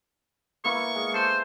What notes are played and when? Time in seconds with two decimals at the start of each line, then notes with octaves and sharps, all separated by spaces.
0.64 A#3 B3 E4 C#6
0.95 G#3
1.14 A4 C5